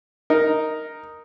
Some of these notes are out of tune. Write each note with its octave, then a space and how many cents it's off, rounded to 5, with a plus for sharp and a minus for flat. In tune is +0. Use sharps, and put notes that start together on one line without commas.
D#4 +0 A#4 +0